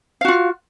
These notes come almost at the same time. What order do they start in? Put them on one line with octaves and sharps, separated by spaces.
F5 F#4 F4